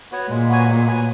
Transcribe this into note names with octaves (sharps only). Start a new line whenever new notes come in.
B3 F#4 C#5
A#2 G#3
B3 F#4 C#5 G#5
G#3
B3 F#4 C#5 G#5